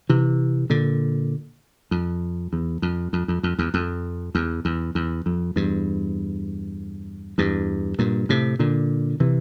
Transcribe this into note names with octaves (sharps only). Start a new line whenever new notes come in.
C3 E3
A#2 D3
F2
E2
F2
F2
F2
F2
E2
F2
E2
E2
E2
F2
E2 G2
E2 G2
G2 A#2
A2 C3
A#2 D3
C3 E3